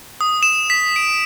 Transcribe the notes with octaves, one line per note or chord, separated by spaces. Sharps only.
D#6
E7
B6
D7